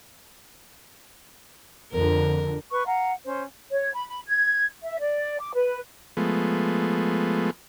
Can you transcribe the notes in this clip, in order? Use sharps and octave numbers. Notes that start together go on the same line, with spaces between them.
F2 D3 A#4
B4 C#6
F5 F#5 A#5
C#4 C5
C#5
B5
B5
G#6
E5
D5
D6
B4
F3 G#3 A3 B3